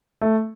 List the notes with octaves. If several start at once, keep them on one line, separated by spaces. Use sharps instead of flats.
A3